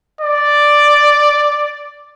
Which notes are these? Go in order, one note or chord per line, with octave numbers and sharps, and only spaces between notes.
D5